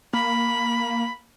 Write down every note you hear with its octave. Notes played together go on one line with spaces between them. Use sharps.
A#3 B5